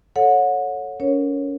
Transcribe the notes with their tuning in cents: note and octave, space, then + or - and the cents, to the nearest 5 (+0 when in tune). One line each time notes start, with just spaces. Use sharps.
A4 +0 C#5 +0 F#5 -30
C#4 +25 A#4 +0 C#5 -10